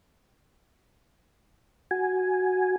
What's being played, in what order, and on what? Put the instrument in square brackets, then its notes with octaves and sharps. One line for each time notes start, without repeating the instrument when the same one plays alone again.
[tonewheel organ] F#4 G#5